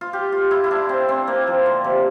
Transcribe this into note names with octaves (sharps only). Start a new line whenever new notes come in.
F4
G4
F4
E4
E4
D4
C4
C4
A#3
F3
D3
C3